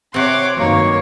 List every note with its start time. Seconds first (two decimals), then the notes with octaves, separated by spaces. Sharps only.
0.14 C3 C4 C#5 F#5 C6 D6
0.57 G2 D#3 F#3 A#3 C#5